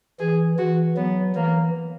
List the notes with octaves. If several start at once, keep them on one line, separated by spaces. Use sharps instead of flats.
E3 G#4
E3 F#4
F#3 B3
E3 A#3